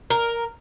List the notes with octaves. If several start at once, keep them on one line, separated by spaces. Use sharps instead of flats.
A#4